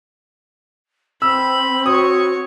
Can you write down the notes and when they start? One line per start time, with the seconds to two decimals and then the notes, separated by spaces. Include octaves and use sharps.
1.22 C4 B5 E6
1.86 F#4 C#5 C#6 D#6